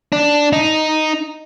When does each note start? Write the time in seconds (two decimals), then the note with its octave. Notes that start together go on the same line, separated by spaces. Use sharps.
0.12 D4
0.53 D#4